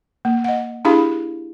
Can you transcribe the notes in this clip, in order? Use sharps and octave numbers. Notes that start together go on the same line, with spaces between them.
A#3
D#5 F#5
D4 E4 G4 G#4 F5 B5